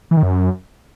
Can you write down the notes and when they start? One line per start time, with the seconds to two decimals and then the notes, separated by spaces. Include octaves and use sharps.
0.11 E3
0.17 D#3
0.23 F#2